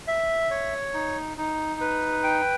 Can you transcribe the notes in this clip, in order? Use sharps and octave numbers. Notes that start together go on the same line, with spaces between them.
E5
C#5
D#4
D#4
B4
G5